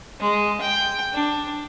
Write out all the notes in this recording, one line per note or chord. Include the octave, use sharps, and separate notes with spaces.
G#3
G5
D4